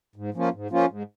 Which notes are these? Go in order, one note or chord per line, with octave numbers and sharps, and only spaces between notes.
G#2
F3 A#3 C#4 F4
G#2
F3 A#3 C#4 F4
G#2